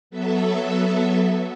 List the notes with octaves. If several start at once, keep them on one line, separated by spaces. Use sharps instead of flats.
F#3 B3 A4 E5